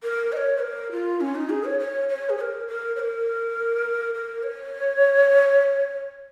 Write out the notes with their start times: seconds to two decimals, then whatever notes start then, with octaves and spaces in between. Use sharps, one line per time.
0.04 A#4
0.32 D#5
0.37 C#5
0.61 A#4
0.92 F4
1.21 C#4
1.35 D#4
1.50 G#4
1.64 C#5
1.79 C#5
2.09 C#5
2.29 G#4
2.37 C#5
2.41 A#4
2.68 A#4
2.96 C#5
2.99 A#4
4.14 A#4
4.43 C#5